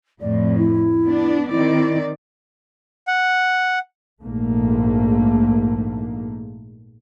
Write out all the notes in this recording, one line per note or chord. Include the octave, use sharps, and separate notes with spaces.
F2 A2 D5
E4
B3 D4
D#3 C4 E4 D5
F#5
A#1 G#2 A3 A#3